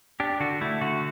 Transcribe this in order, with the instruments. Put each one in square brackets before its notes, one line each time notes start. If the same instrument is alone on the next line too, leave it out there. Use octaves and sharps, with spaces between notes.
[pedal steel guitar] D4 G4
D3 F#4
A3 E4
D3 F#4